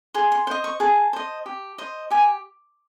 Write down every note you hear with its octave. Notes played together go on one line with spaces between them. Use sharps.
G#4 C6
C6
C5 D#5 C6
C#6
G#4 A5
C5 D#5
G4
C5 D#5
G4 G#5